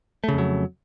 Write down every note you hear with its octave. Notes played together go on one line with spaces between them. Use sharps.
F2 C#3 F#3 A3